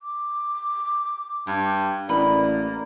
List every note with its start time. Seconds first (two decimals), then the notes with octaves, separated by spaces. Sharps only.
0.01 D6
1.47 G2 G4
2.09 A1 A#3 B4 D5 D#5 F#5